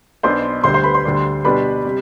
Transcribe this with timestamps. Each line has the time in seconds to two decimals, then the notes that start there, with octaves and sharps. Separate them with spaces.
0.23 B1 B2 B3 D4 C5 C6
0.64 D2 D3 G3 C5 C6
0.74 C5 C6
0.84 B4 B5
0.94 C5 C6
1.05 D2 D3 G3 D4
1.44 B2 G3 D4 B4 B5
1.85 C3 G3